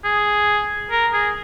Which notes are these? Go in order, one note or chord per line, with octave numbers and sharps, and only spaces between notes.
G#4
A#4
G#4